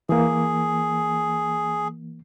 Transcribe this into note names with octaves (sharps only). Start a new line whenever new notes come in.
E3 A#3 G#4